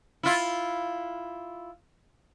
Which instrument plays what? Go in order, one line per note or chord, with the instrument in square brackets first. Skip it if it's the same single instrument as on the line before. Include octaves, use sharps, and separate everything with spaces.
[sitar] E4 F4